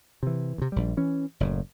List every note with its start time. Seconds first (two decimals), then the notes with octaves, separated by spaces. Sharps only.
0.23 C3 E3
0.58 D2 C3
0.72 A#1 G3
0.97 E3 C#4
1.40 F#1 A2